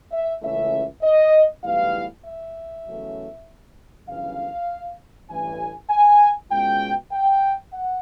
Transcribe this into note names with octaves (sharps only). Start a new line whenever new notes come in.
E5
C#2 C#3 E3 A3 C#4 E5
D#5
B1 A2 E3 G3 B3 F5
E5
E2 C#3 F#3 A3 C#4
G1 F#2 C#3 E3 F5
A1 G2 E3 G#5
G#5
B2 G#3 C#4 F4 G5
G5
F#5